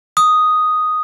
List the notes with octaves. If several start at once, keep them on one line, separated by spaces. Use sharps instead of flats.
D#6